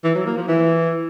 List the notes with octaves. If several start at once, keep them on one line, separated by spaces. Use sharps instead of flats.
E3
F#3
A#3
F3
E3